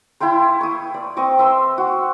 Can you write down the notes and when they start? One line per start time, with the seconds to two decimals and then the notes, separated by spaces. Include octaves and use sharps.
0.20 E4 F5 G5 C6
0.61 C#6 D#6
0.94 D5
1.17 C4 D#5 C#6 D6
1.39 E5 C6 E6
1.78 F#4